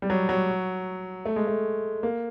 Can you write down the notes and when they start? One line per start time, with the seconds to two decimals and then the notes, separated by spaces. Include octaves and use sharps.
0.02 G3
0.10 F#3
0.29 F#3
1.25 A3
1.36 G#3
1.48 A3
2.03 A#3